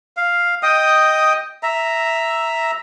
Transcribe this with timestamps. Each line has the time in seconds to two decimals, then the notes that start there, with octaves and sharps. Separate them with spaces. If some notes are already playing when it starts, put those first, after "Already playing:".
0.17 F5
0.63 D#5 G5 D#6
1.63 E5 A#5